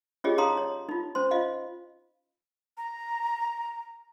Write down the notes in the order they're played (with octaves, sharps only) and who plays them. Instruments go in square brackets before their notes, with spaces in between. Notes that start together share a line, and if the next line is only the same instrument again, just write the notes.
[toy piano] C#4 F4 G4 G#4 C#5 D#5
D#4 C#5 F5 A#5 C6 D#6
C#5
D#4 F4
C#4 C5 C6
F4 D#5 F5
[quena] A#5